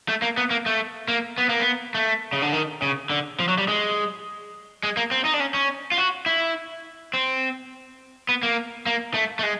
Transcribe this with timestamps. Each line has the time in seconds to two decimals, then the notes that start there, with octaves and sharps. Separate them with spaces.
0.09 A3
0.22 A#3
0.37 B3
0.51 A#3
0.66 A3
1.08 A#3
1.38 B3
1.49 A#3
1.60 B3
1.95 A3
2.33 C#3
2.42 D3
2.53 D#3
2.82 C#3
3.10 D3
3.40 F3
3.48 F#3
3.58 G3
3.68 G#3
4.83 G#3
4.97 A#3
5.11 C4
5.25 D#4
5.34 D4
5.40 C#4
5.54 C#4
5.92 F4
5.98 F#4
6.26 E4
7.14 C4
8.29 B3
8.43 A#3
8.86 A#3
9.14 A3
9.39 A3
9.43 G#3